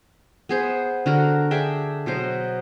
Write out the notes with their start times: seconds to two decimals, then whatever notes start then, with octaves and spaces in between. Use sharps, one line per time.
0.49 B3 G#4 C5
1.06 D3 F#4 A#4
1.51 D4 G#4 E5 G5
2.06 B2 F#3 C5 D#5